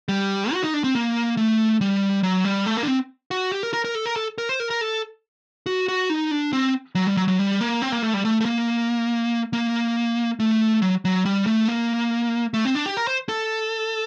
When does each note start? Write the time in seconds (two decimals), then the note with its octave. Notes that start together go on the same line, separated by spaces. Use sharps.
0.08 G3
0.53 F#4
0.63 D#4
0.74 D4
0.84 C4
0.95 A#3
1.37 A3
1.81 G3
2.23 F#3
2.44 G3
2.66 A3
2.77 A#3
2.83 D4
2.88 C4
3.31 F#4
3.52 G4
3.63 A#4
3.73 A#4
3.85 A#4
3.95 A4
4.06 A#4
4.16 A4
4.38 A#4
4.49 C5
4.60 A#4
4.70 A#4
4.81 A4
5.66 F#4
5.88 F#4
6.10 D#4
6.31 D4
6.53 C4
6.95 F#3
7.07 G3
7.17 F#3
7.28 F#3
7.39 G3
7.61 A#3
7.82 C4
7.92 A#3
8.03 A3
8.14 G3
8.25 A3
8.40 A3
8.45 A#3
9.53 A#3
10.40 A3
10.82 F#3
11.05 F#3
11.25 G3
11.47 A3
11.68 A#3
12.54 A3
12.65 C4
12.75 D4
12.86 G4
12.97 A#4
13.07 C5
13.29 A4